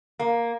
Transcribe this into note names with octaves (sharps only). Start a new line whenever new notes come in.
A#3